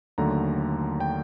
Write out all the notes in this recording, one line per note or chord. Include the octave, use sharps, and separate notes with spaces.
D#2 D3 F#3 A3 A#5
G5